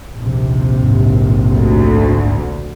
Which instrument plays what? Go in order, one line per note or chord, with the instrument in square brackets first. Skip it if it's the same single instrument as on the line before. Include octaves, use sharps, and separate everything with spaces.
[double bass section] A#1 D#2 C3
[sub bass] G#2
[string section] D2